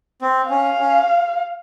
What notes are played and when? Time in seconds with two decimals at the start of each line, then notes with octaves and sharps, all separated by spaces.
0.21 C4
0.50 C#4 F5
0.79 C#4